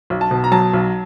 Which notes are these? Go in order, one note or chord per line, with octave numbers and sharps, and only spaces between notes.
B1
A5
B2
A#5
F#3 A5
B1